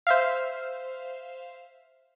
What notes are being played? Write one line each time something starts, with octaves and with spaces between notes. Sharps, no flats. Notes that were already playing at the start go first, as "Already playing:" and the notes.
C5 E5 F5